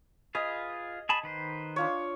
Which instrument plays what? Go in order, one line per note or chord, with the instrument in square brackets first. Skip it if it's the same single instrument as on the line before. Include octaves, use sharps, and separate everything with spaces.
[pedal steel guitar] F4 G#4 B4 [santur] D#5
[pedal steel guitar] G#4 A5 B5
D#3 B4 C5
[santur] D4 F4 C#5